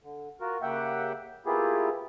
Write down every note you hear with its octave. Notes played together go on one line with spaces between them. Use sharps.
D3
F4 F#4 A#4
C#3 A#3 G4 E5 F#5 G5
A#3 B3 E4 F4 G4 G#4